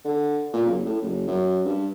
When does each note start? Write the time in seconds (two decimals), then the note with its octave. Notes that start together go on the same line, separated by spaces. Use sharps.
0.04 D3
0.53 A#2
0.66 F#1
0.85 A2
1.02 F#1
1.27 F#2
1.66 G2